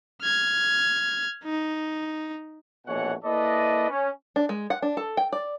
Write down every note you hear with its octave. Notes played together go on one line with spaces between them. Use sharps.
F6 G#6
D#4
A#1 B2 E3 A3 C#5 F#5
A#3 E4 A4 B4 D5 D#5
C#4
D4
G#3
F#5
D4
A4
G5
D5